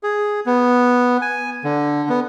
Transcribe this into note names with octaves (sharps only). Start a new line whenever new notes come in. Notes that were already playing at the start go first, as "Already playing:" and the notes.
G#4
B3
G#5
D3
B3